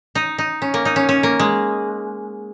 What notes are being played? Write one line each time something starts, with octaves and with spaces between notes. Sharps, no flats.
D#4
D#4
C#4
A#3
D#4
C#4
C#4
A#3
G#3